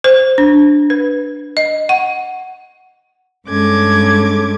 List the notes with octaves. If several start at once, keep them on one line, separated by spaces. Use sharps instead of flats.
C5
D4
B4
D#5
F#5
G2 G#3 C#4 A4 D6 G#6